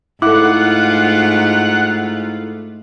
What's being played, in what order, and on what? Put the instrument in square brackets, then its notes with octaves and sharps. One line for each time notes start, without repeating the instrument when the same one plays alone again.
[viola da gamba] G#2 A3 F4 [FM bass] E4 [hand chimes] A4 D6 [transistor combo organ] F#5